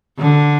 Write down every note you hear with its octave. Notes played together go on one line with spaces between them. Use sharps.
D3